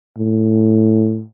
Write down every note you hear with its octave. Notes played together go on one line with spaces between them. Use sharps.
A2